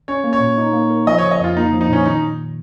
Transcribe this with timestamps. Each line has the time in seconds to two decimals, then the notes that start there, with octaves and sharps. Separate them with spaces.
0.08 C#4 C#5
0.24 A#3
0.33 C#5
0.40 A#2
0.58 D#4
0.73 A#3
0.90 A#4
1.07 F3 D#5
1.18 C#3 C#5
1.31 D#5
1.40 F2 F4
1.56 A#3 D#4
1.73 F3
1.81 D#4
1.88 A#2 C#4
2.06 D#3 D#4